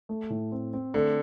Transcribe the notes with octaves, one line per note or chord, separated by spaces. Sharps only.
A3
A2
C4
C4
D3 A3